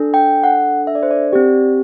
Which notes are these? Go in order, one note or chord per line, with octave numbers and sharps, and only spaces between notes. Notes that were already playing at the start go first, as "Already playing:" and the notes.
Already playing: D4 A4
G5
F#5
E5
D5
C5
D5
C4 G4